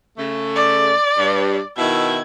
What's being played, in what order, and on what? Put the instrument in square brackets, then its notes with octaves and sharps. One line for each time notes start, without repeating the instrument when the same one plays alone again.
[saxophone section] C#3 A3
[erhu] D5
[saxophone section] G2
[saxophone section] B2 D#3 E4 [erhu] G#6